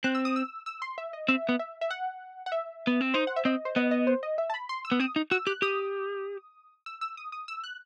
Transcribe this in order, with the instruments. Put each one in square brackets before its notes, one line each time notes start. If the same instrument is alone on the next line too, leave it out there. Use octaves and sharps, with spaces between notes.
[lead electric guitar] C4 [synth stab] F#6
[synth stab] E6
D#6
E6
E6
C6
E5
D#5
[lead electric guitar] C4 [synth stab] E5
[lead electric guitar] B3
[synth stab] E5
E5
F#5
F#5
E5
[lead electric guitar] B3
C4
[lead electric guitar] D#4 [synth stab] C5
[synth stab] F#5
E5
[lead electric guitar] C4 [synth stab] D#5
[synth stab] C5
[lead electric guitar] B3 [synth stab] D#5
[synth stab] D#5
C5
D#5
E5
A5
B5
C6
E6
[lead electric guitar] B3
[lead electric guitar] C4 [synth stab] D#6
[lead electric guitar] D#4
[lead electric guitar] F#4 [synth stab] E6
[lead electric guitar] G4 [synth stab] F#6
[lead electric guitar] G4 [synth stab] D#6
[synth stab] E6
E6
D#6
D#6
E6
F#6